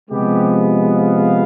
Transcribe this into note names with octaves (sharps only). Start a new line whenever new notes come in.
C3 F3 G#3 B3 G4
F5